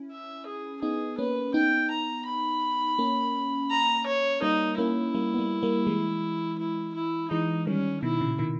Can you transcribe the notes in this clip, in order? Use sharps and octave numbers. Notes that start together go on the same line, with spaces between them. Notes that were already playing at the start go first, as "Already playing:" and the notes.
Already playing: C#4 E4
E5
G#4
B3 D#4 G#4
A#3 C#4 B4
B3 D#4 G5
A#5
B5
A#3 C#4
A#5
C#5
G3 A#3 D#4
A#3 C#4 E4
G3 A#3
B3
G3 A#3
G3 A#3
E3 G#3
E4
E4
E3 G#3 D#4
D#3 G3 C#4
B2 D#3 E4
A#2 C#3
B2 D#3